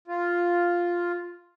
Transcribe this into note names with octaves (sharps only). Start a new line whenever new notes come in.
F4